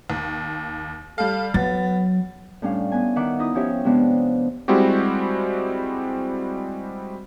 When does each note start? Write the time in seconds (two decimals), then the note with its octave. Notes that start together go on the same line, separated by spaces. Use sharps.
0.10 D#2
1.18 G3 A4 F5
1.54 F#3 B3 A6
2.62 A2 G3 C#4 D4 F5
2.92 B3 G#5
3.16 D#3 E5 F#5 D6
3.39 D#4 E4 D#6
3.55 F3 C#4 G4 C#5 E5
3.84 C3 F3 G#3 B3 D4 F4
4.68 G3 G#3 C4 E4 F#4 G4